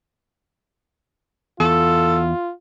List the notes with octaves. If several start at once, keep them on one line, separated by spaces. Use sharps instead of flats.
E2 F4 A4